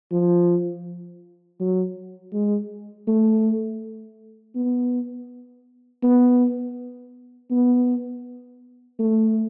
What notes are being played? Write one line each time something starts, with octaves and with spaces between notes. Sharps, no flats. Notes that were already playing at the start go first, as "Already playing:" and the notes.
F3
F#3
G#3
A3
B3
B3
B3
A3